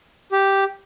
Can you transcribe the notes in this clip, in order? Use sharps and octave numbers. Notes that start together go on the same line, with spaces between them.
G4